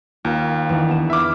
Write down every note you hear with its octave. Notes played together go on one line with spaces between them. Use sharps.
D#2 F4 A#4 G#5
E2 D#3 D4
B3 G#4 E7
E5 B5 D6 F6 G#6